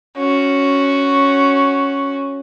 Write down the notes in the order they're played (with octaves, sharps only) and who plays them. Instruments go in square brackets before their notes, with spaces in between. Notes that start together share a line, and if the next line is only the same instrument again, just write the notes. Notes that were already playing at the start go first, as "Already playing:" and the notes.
[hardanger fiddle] C#4 F#4